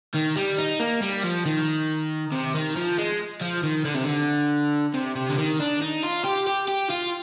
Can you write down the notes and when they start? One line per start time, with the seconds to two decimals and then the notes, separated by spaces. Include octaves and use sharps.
0.15 D#3
0.36 G3
0.58 D#4
0.79 A#3
1.02 G3
1.23 F3
1.45 D#3
2.32 C3
2.54 D#3
2.76 F3
2.98 G#3
3.41 F3
3.63 D#3
3.85 D3
3.95 C3
4.04 D3
4.94 C3
5.16 C3
5.29 D3
5.38 D#3
5.60 D4
5.82 D#4
6.03 F4
6.24 G4
6.47 G4
6.68 G4
6.90 F4